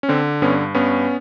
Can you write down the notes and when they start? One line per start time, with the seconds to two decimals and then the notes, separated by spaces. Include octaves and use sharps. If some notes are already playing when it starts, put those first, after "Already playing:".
0.03 C#4
0.09 D3 C4
0.42 G2 B3 C#4
0.74 G2 B3 C#4